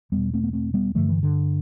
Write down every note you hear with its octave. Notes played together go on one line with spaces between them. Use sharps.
E2 B2 G3 B3
A3 C4
B3
A3 C4
G3 B3
G2 D3 F3 A3
E3
D3